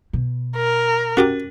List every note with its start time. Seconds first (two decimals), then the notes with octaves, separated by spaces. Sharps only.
0.13 B2
0.56 A#4
1.17 C#4 F#4 G4 A#4 D6